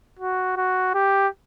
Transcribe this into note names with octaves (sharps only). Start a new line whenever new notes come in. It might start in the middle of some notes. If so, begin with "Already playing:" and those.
F#4
F#4
G4